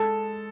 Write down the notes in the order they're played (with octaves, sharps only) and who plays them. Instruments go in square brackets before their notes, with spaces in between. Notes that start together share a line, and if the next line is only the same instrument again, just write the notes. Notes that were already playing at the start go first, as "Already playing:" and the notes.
Already playing: [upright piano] G#3 [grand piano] A4